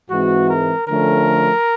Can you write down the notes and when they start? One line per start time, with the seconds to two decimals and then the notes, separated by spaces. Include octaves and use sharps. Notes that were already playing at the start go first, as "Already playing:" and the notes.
0.10 G#2 E3 G#3 C4 F#4
0.49 A#4
0.88 D3 F3 A3 C#4 A#4